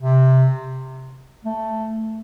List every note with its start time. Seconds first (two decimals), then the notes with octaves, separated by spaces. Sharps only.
0.01 C3
1.45 A3